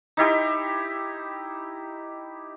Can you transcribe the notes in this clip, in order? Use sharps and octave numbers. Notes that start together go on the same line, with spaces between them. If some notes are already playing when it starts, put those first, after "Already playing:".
D#4 E4 G4